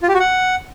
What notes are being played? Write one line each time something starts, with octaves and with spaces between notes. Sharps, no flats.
F4
G4
F#4
F#5